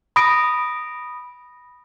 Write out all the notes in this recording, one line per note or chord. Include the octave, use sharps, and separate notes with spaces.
B5 D#6 A#6 D7